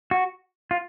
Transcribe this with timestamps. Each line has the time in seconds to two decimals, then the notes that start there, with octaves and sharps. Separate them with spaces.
0.11 F#4
0.71 F4